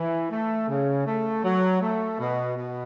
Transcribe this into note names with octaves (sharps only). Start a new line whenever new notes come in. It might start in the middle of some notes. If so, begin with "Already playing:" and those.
Already playing: E3
A3
C#3
A3
F#3
A3
B2
B2